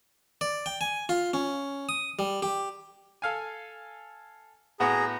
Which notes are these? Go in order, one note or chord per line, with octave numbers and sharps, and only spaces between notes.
D5
G5
G#5
F4
C#4
D#6
G3
G4
A4 F5 G#5
A2 B3 F#4 G#4 A#5